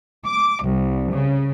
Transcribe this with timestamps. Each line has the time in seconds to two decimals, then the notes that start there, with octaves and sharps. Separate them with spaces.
0.24 D6
0.62 C2
1.11 C#3